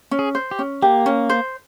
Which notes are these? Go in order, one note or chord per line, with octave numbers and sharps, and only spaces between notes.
C#4
G#4
C5
G4
C#4
A#3 G4
C#4
C5